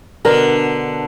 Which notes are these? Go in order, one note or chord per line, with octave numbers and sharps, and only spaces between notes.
B2 D3 B3 A#4